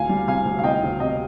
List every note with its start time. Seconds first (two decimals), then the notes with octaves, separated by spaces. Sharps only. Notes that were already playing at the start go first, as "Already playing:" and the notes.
Already playing: D2 F5 G#5
0.09 G3
0.28 C3 F5 G#5
0.45 D2
0.59 F5
0.63 C3 D#5 G5
0.83 D2
1.00 C3 D#5